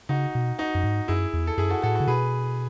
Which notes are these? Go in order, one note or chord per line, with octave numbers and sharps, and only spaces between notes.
C#3 D#4 F#4
B2
D#4 F#4
F#2
G#2
F#2 E4 G#4
E2
A4
F#2 E4 G#4
F#4 A4
A2 F#4 A4
F#4 A4
C#3
B2 G#4 B4